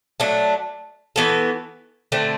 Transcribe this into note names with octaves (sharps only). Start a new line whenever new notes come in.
F#3 A3 D4
E3 B3 F#4 A4
D3 A3 C4